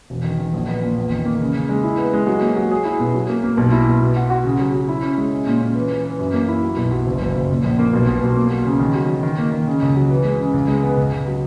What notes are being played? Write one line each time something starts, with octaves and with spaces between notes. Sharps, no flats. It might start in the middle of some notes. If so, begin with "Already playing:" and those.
E1
D#3
D#3
A#1
B3
A#2
E2
D#3
A#3
C#3
C#3
G#3
E4
B3
G#3
F#3
A#3
F#3
G#4
E4
B2
F#3
A#3
A#3
B1
E4
B1
B2
F#4
F#4
C#3
F#3
F#3
E4
C#4
G#3
C#4
A#2
C#4
E3
E3
E3
F#2
A#3
E4
F#3
B1
F#3
F#1
F#1
F#1
A#2
A#1
A#3
B1
B2
B1
A#3
F#3
C#3
D#3
F#3
D#3
D#3
A#3
D#3
C#3
C#2
F#3
E3
G#3
C#3
C#2
G#3
B3
C#2
C#2
F#3